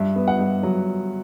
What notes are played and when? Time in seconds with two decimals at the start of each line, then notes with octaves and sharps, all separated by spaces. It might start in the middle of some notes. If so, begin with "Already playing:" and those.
Already playing: G2 E5
0.16 B3
0.28 F#5
0.39 G2
0.63 F#3